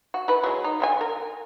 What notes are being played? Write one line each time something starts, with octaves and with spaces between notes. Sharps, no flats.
F#4
E4 B4
F#3 G#3
D#4
D3 E4 G#5
A#4